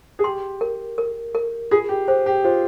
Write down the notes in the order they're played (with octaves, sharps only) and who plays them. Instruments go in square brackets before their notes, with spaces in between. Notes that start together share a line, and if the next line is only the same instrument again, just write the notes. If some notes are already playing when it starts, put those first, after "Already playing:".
[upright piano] G#4
[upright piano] G4 [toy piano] C6
[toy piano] A#4
A#4
A#4
[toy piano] F4 [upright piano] G#4
[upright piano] G4
[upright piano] G4 [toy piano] C5
[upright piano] G4
[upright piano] F4 [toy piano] C5